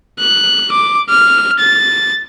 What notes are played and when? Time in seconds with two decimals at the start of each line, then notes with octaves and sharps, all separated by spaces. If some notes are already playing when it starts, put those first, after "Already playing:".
0.20 F#6
0.72 D6
1.09 F6
1.60 A6